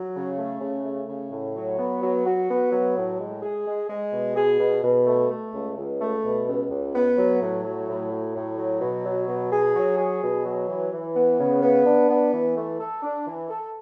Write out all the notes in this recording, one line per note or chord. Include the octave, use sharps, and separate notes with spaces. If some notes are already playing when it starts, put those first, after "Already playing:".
Already playing: F#3
C#3
A3
C#3
A3
C#3
A2
F#3
B3
F#3
F#4
B3
F#3
A2
G#3
G#4
G#3
G#3
B2
G#4
B2
B2
A3
A3
C#2
C#2
A3
B2
C#2
C#2
B3
F#3
A2
F#3
A2
F#3
A2
F#3
B2
F#3
B2
G#4
F#3
G#4
B2
F#3
E3
E3
B3
C#3
B3
D4
B3
E3
A3
A4
D4
E3
A4